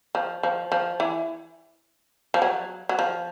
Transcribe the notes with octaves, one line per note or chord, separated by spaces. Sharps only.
F3
F3
F3
E3
F3
F#3
F#3
F3